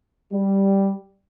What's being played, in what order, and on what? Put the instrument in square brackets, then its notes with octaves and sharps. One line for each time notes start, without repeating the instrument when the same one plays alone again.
[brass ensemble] G3